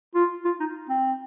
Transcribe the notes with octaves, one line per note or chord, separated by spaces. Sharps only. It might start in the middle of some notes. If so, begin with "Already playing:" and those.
F4
F4
D#4
C4